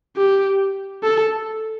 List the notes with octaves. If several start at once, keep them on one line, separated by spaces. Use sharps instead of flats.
G4
A4